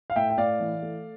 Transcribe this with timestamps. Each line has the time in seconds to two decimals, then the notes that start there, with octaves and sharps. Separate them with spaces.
0.10 F5
0.16 A2 E5 G5
0.30 G5
0.37 A2 D5 F5
0.60 E3
0.82 A3